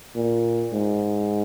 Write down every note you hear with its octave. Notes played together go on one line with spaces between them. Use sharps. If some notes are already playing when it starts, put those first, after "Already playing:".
A#2
G#2